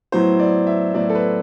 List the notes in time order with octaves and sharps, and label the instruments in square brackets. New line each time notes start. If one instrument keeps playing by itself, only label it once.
[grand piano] A2 F#3 B3 E4 C5
D5
E5
A2 F#3 B3 E4 D5
A4
B4